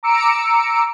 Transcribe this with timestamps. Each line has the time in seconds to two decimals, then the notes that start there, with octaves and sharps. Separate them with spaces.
0.03 A#5 D6 E6 C#7 D7